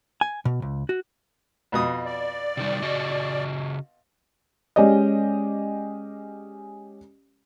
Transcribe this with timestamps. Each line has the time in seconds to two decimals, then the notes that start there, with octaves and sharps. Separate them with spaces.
0.21 G#5
0.45 B2
0.62 C#2
0.89 F#4
1.72 F2 B2 D#6
2.06 D5
2.57 C3 D#3 G3
2.82 C#3 F#4 D#5
4.76 G#3 C#4 G4 D5 D#5